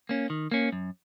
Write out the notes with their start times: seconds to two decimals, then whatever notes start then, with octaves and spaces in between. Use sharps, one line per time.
0.09 A#3 C#4
0.30 D#3
0.51 A#3 C#4
0.72 F#2